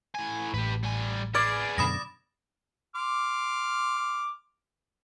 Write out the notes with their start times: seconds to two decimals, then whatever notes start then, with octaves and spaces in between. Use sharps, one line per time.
0.15 A2 G#5
0.54 A1 G4 B4
0.83 G3 G#5
1.35 B3 G#4 D5 F6 G#6 D7
1.78 F#2 B2 D3 B5 D#6 A#6
2.95 C6 D6 F6